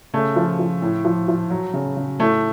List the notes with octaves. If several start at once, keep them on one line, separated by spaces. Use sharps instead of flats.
C#3 A3
F3
F3
A2
F3
F3
F#3
C#3
C#3
A2 A3